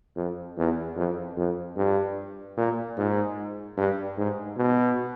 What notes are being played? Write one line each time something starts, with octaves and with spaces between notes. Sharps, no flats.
F2
E2
F2
F2
G2
A#2
G#2
G2
G#2
B2